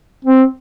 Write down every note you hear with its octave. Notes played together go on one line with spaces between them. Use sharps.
C4